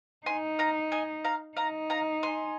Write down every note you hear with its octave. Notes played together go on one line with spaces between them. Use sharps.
D#4 G#5 C6
F5 A#5
D#5 G#5
F5 A#5
D#4 F5 A#5
F5 A#5
G#5 C6